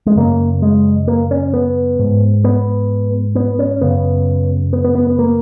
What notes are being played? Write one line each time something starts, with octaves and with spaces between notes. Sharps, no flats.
G#3
F#2 C#3 A#3
G#3
A#3
C#4
B3
G#2
B3
B3
C#4
F#2 C#3 B3
B3
B3
B3
B3
A#3